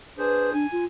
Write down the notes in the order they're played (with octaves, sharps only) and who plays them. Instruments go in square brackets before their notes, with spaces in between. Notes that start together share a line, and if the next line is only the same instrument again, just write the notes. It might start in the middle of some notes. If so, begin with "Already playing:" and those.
[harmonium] D4 G#4 C5 [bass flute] B4
[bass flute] D4 [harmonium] G#5
[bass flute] F4